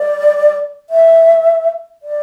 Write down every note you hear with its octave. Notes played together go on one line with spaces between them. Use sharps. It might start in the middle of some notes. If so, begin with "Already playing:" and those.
Already playing: D5
E5
D5